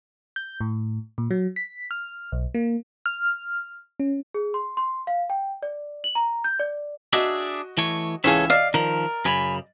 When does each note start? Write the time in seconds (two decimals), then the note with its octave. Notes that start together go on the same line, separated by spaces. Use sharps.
0.36 G6
0.61 A2
1.18 A#2
1.31 F#3
1.56 B6
1.91 F6
2.32 B1
2.55 A#3
3.06 F6
4.00 C#4
4.34 G#4
4.54 C6
4.77 C6
5.07 F5
5.30 G5
5.63 D5
6.04 F#7
6.15 A#5
6.44 G6
6.60 D5
7.13 D4 F#4 G#4 D#5 E5
7.77 E3 A3 C#5
8.24 C#2 E3 G#4 A4 C#5 E5 F5
8.50 D5 D#5 F5
8.74 D#3 F3 A#4
9.25 F#2 C#3 G#5 B5